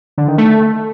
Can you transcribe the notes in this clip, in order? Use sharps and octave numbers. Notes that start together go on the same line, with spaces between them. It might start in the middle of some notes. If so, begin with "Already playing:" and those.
D3
D#3
A3